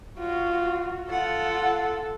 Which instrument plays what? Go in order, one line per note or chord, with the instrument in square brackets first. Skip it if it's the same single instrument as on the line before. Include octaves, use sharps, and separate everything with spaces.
[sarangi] F4 [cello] F#4
[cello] F4 F#5 [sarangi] A4